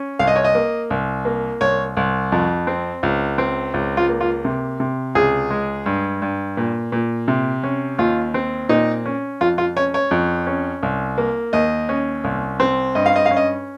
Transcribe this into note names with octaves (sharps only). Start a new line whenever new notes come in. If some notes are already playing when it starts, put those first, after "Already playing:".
Already playing: C#4
C2 F5
D#5
C#5
D#5
A#3
C2
A#3
C2 C#5
C2
F2
C4
C#2
C4
C#2
F4
A#3
F4
C3
C3
C#2 G#4
G#3
G2
G2
A#2
A#2
C3
C#4
D#2 F4
C4
A#2 D#4
C#4
F2 F4
F4
C#4 C#5
C#5
F2
C#4
C2
A#3
D#2 D#5
C#4
C2
C4
G2 D#5
F5
D#5
F5
C#4
D#5